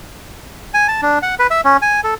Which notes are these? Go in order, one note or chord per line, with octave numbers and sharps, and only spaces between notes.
G#5
A5
D4
F#5
B4
E5
C#4
G#5
A4